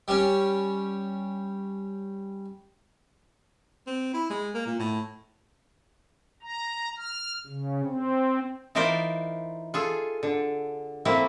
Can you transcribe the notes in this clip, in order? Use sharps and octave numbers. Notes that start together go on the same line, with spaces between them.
G3 C#4
C4
E4
G#3
A#3
A#2
A2
A#5
F6
C#3
C4
E3 D#4 F4 A#4 C5 D5
F4 G#4 A4
D3
A3 A#3 C4 E4